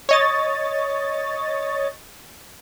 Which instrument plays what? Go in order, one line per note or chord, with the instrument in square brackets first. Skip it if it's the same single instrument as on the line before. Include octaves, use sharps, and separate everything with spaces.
[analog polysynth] C#5 D#5 A6